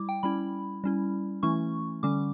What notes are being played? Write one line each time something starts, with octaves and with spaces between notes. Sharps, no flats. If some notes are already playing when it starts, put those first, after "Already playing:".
Already playing: G3 E4 D6
G5
G3 C#4 E4 B5
G3 C#4 E4
E3 A3 C#4 E4 C#6
D3 G3 C#4 D6